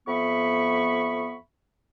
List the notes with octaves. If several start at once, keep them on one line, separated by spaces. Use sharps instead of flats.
F2 B3 E5 B5 C#6